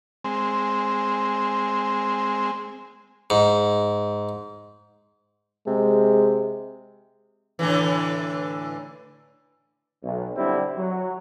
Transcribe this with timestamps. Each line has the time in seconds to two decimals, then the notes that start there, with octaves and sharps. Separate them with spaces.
0.24 G#3 C4
3.30 G#2
5.67 C3 G#3
7.59 A2 D3 E3
10.03 B1
10.36 D3 G3 C4 E4
10.77 F#3